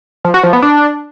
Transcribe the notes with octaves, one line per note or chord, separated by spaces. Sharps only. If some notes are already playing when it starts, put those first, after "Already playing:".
F3
F#4
F3
B3
D4